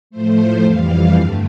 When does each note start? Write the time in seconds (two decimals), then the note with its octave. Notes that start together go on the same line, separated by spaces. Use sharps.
0.10 A2 F3 A3 C5
0.63 F2 E3 G3 F5
1.15 G2 D3 A3